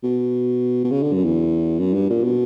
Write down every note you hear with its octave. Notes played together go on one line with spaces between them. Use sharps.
B2
B2
C#3
D3
F#2
E2
F#2
G2
A#2
B2